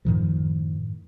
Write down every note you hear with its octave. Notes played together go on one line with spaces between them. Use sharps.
F#2 A2 D#3 F3